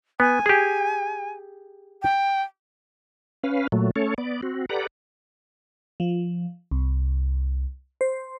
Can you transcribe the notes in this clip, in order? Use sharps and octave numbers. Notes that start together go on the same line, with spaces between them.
B3 G#5
G4 G#4
G5
C#4 B4 F5
A#2 F#3 A3
A3 C#4 A4 C#5
B3 D5
C4 F#4
G4 A4 B4 D5 F#5 A#5
F3
C2
C5